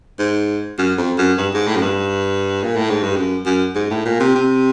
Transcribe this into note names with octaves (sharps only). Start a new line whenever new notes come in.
G#2
F#2
F2
F#2
G2
G#2
A2
F#2
G2
A#2
A2
G#2
G2
F#2
F#2
G#2
A2
A#2
C3
C3